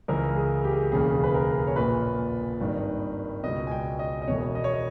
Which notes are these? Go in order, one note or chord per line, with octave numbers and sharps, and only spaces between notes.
C#2 C#3 E3 A#4
G#4
G4
G#4
G4
E1 D#2 C#3 E3 G#4
B4
A#4
C#5
A#1 A#2 B4
G#1 G2 D#3
C#2 B2 D#5
G#5
G5
D#5
D#5
E1 E2 B2 C#5
D#5
C#5
D#5